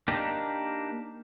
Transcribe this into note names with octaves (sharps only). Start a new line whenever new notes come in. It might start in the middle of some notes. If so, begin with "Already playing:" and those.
A#3 D4 D#4 G4